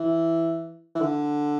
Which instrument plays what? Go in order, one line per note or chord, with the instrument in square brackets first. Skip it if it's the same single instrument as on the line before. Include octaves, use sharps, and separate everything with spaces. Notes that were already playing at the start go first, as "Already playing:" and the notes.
Already playing: [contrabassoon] E3
E3
D3